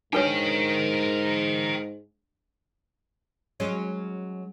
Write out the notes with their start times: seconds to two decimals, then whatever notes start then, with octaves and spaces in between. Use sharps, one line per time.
0.13 G#2 D4 A#4 B4 C#5 G5
3.60 F#3 G#3 C#4